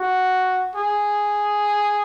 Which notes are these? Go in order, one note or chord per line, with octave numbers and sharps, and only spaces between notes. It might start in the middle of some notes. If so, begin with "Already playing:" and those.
Already playing: F#4
G#4